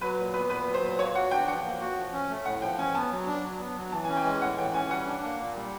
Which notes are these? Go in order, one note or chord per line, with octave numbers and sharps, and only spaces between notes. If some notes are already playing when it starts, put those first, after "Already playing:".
F#3 B4
A#2
B3 B4
A#2 B4
F#3
C5
A#2
A#3 C#5
F#4 F#5
D4 G5
F3 F#5
A#3
F#4
F3
C#4
A3
A2 F#5
F3 G5
C#4 G#5
B3 A5
F#3
D4
F#3
B3
F#3
E3 A5
G#5
C#4
G5
G#3
A2 F#5
E3 G5
C#4 G#5
G3 F#5
D4
A#3
A#2
G3